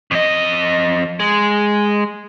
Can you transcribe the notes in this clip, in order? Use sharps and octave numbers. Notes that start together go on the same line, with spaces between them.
F2 D#5
G#3